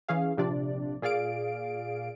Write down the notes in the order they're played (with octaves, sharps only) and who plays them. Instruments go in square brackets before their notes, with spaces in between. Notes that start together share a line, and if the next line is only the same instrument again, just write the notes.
[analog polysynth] E3 C#4 G#4 F5
A#1 C3 F3 D4 D5
A#2 G#4 D5 F5 D7